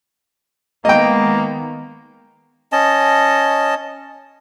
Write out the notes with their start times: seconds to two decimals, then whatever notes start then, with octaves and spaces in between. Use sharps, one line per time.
0.85 D#3 G#3 A#3 B3 D#5 G5
2.72 C#4 D#5 A5